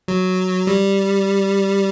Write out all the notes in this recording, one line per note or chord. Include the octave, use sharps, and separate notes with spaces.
F#3
G3